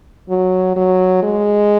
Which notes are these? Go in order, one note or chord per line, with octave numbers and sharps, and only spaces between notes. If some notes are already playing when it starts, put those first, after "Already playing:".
F#3
F#3
G#3